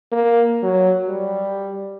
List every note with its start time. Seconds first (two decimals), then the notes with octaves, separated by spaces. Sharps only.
0.12 A#3
0.63 F#3
1.09 G3